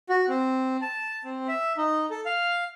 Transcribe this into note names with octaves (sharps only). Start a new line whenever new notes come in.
F#4
C4
A5
C4
E5
D#4
A4
F5